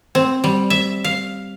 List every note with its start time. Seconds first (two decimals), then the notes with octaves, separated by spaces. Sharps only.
0.15 C4
0.44 G3
0.70 E5
1.04 F5